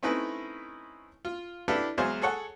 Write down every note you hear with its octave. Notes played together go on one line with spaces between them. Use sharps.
A3 C4 C#4 D#4 E4 B4
F4
D4 E4 G4 A4 B4 F5
E2 F#3 G#3 G#4 C5 F5
G#4 A4 C#5 F#5